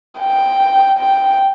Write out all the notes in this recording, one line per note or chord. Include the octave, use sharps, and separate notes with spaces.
G5
G5